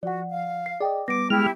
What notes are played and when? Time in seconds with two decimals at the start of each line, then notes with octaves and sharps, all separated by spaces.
0.03 F3 F#4 D5 F#5
0.29 F5
0.66 C7
0.80 G#4 D5 D#5 G5
1.08 G3 B3 D6 A#6 D7
1.30 G#3 E4 G4 F6